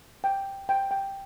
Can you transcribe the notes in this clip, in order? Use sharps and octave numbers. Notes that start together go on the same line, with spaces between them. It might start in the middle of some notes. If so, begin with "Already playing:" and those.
G5
G5
G5